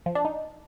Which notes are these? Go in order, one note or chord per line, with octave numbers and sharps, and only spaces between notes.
F3
D4
D#4